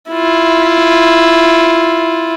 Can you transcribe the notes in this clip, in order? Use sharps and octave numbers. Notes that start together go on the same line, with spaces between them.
E4 F4